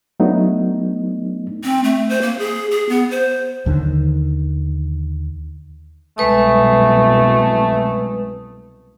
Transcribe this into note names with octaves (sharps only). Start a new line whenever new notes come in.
F#3 A3 B3 D4 D#4
C4
A3
C5
A#3
G#4
G#4
B3
C5
D#2 D3 D#3
C2 F#2 B2 G#3 A3 B4 D#6